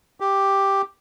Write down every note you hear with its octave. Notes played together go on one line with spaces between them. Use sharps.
G4